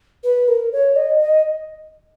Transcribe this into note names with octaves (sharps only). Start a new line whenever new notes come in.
B4
A#4
C#5
D#5
D#5